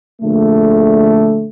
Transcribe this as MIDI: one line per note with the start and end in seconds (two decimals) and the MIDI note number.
0.22 1.49 34
0.22 1.49 50
0.22 1.49 57